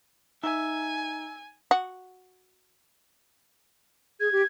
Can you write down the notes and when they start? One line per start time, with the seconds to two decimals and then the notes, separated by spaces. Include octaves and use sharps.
0.44 D#4 E5 G#5
1.71 F#4
4.20 G#4 G#6
4.32 G4